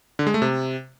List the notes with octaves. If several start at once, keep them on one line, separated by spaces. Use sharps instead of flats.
D3
G#3
A3
C3